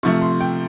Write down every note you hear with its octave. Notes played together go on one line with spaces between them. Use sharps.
C3 F3 A3 C#6
C6
G5